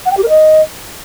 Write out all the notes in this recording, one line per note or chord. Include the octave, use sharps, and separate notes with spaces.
F#5
G5
G4
A#4
D#5